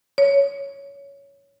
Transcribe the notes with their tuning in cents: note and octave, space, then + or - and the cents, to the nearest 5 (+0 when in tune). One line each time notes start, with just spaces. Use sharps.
C#5 +10